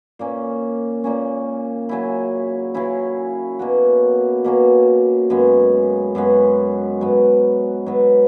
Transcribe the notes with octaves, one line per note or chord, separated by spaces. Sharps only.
A#2 A#3 C#4
A#2 A#3 C#4
C#3 F#3 C#4 E4
C#3 F#3 C#4 E4
B2 A#3 C#4 F#4
B2 A#3 C#4 F#4
F#2 C#3 G#3 B3
F#2 C#3 G#3 B3
G#2 F#3 B3
G#2 F#3 B3